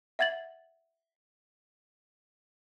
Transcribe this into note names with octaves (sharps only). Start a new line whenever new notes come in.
E5 F#5 G#6 A6 F#7